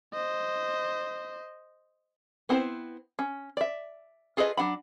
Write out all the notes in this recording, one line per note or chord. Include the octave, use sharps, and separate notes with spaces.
C5 D#5
B3 C4 E4 A4 C5
C#4
D5 E5
F4 G#4 A4 B4 D#5
F#3 D4 F#5 B5